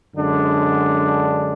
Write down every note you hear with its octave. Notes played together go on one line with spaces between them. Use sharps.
F#2 D3 G#3 D4